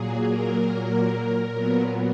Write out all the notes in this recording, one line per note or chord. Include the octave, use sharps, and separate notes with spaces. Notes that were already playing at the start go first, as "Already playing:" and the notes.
Already playing: A#2 F#3 A#3 G#4
A#4
A#2 F#3 B3